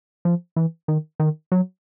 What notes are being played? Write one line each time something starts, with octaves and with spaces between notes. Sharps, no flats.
F3
E3
D#3
D#3
F#3